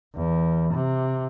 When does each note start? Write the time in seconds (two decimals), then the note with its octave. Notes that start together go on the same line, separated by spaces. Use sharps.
0.16 E2
0.74 C3